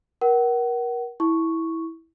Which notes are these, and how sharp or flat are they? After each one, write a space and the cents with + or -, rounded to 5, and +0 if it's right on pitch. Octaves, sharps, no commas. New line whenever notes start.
A#4 +30 F#5 +35
E4 -15 C#6 +0